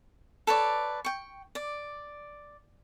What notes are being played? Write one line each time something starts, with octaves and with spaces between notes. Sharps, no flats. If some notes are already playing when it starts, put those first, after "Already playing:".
A4 B4 C#5 D5
G5 C#6
D5